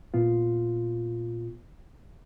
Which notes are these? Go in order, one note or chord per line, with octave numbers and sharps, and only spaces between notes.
A#2 B3 F4